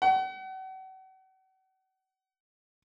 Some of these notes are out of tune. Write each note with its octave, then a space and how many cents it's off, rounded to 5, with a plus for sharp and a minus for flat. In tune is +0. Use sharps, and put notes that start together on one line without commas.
F#5 +40